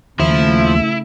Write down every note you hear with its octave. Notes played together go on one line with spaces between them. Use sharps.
D#2 C#3 F3 A3 E4